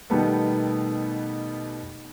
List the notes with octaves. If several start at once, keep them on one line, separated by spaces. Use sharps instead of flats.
B2 D#3 G3 A3 B3